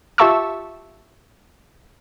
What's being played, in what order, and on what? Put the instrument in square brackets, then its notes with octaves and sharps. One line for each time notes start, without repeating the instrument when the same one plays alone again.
[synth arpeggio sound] F4 G4 E5 A5 C#6 E6